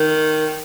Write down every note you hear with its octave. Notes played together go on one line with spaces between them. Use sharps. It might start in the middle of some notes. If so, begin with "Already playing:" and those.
Already playing: D#3